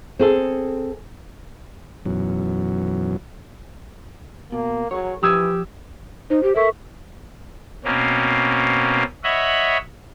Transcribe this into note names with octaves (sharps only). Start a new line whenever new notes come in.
C4 G#4 A4
F#2 B2 E3 F#3
B2 A#3
F#3 G#4 A#4 C#5
E3 F3 G4 D#6 E6 G#6
D#4 C5
G4
A4 A#4 E5 C#6
B2 A#3 C4 C#4
C#5 D#5 E5 F#5 B5